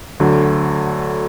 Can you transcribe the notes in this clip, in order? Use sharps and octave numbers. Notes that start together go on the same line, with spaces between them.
D2 D3 F#3